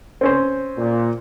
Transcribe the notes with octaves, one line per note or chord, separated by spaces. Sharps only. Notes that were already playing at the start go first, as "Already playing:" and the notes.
C4 C#4 C5
A#2